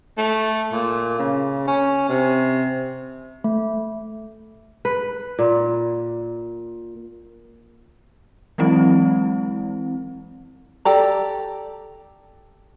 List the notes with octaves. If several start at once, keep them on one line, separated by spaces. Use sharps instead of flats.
A3
A#2
C#3
C#4
C3
A3
B4
A#2
E3 F#3 G#3 C4 E4
G4 A4 D5 A#5